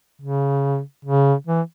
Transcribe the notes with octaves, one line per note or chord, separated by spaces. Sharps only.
C#3
C#3
E3